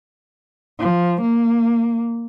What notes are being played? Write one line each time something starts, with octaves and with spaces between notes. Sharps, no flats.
F3
A#3